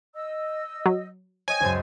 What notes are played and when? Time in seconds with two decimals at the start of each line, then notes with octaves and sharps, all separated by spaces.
0.14 D#5 E6
0.86 F#3
1.48 C#5 D#5 G5 G#5
1.60 C#2 F#2 C5 A5